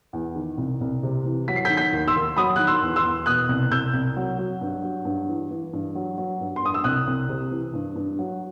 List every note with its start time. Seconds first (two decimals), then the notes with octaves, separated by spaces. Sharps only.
0.13 E2
0.36 D#3
0.57 C2
0.81 C2
1.03 C3
1.26 E3
1.48 F#3 B6
1.56 C7
1.65 G6 B6
1.70 D#3
1.77 G6 B6
1.92 D#2
2.08 C6 E6
2.15 D#2
2.37 F#3 B5 D#6
2.56 D#3 F#6
2.67 C6 E6
2.82 E2
2.96 C6 E6
3.04 E2
3.26 B2 D#6 F#6
3.49 C2
3.71 C2 E6 G6
3.93 C2
4.16 F#3
4.38 F#3
4.61 G2
4.83 F#3
5.05 G2
5.28 E3
5.50 E3
5.73 G2
5.95 F#3
6.18 F#3
6.40 G2
6.56 C6
6.63 G2 D#6
6.74 E6
6.84 C2 D#6 F#6
7.07 C2
7.29 C3
7.51 E3
7.73 G2
7.96 G2
8.19 F#3